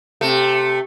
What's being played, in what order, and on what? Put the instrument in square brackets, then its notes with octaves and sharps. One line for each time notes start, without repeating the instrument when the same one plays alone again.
[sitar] C3 A3